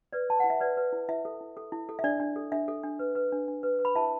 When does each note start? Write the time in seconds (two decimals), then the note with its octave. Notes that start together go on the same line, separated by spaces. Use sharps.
0.13 B4 D5
0.29 B4 A5
0.40 E4 F#5
0.50 E5
0.60 B4 D5
0.77 B4
0.92 E4
1.09 E4 E5
1.25 A4
1.41 E4
1.57 A4
1.72 E4
1.89 A4
1.99 E5
2.04 D4 D5
2.20 D4
2.36 A4
2.52 D4 E5
2.68 A4
2.83 D4
2.99 B4
3.15 B4
3.32 D4
3.48 D4
3.63 B4
3.79 B4
3.85 B5
3.95 E4 E5 A5